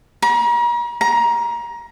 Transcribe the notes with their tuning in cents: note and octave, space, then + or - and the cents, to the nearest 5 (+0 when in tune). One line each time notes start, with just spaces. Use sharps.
A#5 +40
A#5 +20